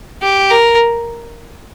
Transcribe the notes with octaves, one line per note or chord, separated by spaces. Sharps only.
G4
A#4